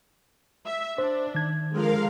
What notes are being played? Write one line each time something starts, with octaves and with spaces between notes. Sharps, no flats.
E5
D4 C5
D#3 G#6
D3 F3 G#3 A#4 F5